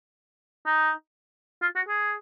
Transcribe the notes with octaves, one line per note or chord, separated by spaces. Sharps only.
D#4
F4
F#4
G#4